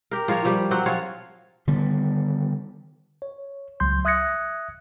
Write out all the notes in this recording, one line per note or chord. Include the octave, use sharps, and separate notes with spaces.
G4 A#4
F3 F4 A#4 C#5
F3 G3 G4
F#3 C4 F#4
F3 F4 C#5
D3 D#3 G3 B3
C#5
C#2 F#3 C6 G6
E5 D#6 F#6 G#6 A#6 C#7